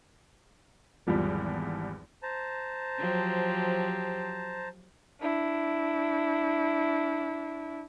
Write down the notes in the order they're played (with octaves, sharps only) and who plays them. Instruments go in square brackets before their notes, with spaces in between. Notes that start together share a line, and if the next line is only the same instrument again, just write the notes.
[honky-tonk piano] G#1 E2 F3 G3
[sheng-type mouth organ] C5 A5 A#5
[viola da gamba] F3 F#3 G4
[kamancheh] D4 E4